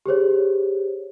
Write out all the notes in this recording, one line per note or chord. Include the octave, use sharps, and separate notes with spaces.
G4 G#4 C5 C#5